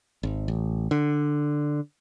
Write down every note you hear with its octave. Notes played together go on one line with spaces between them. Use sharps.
G#1
A1
D3